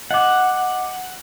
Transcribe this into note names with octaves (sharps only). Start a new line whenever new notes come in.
D#5 F#5 D6